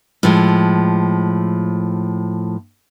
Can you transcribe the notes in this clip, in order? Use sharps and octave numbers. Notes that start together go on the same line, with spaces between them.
A2 F3 G#3